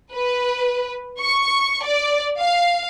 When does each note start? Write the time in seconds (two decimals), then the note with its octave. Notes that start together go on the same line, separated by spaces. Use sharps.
0.14 B4
1.19 C#6
1.84 D5
2.40 F5